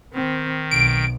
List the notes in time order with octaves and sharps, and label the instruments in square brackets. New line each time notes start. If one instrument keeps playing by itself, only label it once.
[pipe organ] D#3 [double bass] C4
[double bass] B1 [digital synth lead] D7